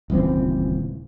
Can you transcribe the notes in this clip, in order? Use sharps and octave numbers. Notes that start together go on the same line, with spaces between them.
D#1 C#2 E3 C4